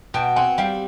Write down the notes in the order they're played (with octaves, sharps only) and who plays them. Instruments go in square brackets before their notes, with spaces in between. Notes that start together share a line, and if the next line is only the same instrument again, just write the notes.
[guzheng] B2 [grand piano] G5 A5
[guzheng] C4 [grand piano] F#5 G#5
[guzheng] G3 [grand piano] F5 G5